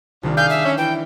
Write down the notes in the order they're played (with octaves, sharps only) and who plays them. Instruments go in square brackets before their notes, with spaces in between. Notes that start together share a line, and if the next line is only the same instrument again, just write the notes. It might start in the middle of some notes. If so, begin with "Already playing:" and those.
[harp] C2 D#3 D4 [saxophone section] A#2 F3 G3
[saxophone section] G#4 F5 [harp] B5 [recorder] G6
[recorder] E5
[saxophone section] C#4
[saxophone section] E3 [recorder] G5